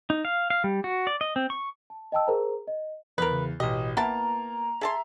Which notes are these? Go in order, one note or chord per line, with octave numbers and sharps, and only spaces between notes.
D#4
F5
F5
G3
F#4
D5
D#5
C4
C#6
A5
D#5 G5 A5 E6
G#4 A#4 C5 A#5
D#5
E2 A#4 B4
C#3
A1 B2 G4 D#5
A#3 B3 E4 A5 A#5
G#4 E5 A5 C6